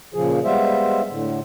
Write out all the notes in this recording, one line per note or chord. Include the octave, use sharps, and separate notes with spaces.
A#2 C#3 F3 G#4
G3 G#3 B3 C5 E5 F5
A2 D3